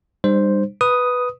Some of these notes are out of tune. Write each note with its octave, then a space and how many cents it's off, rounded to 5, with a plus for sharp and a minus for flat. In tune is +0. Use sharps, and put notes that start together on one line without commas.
G3 +25 D#4 -45 C5 +0
B4 +0 D#6 +0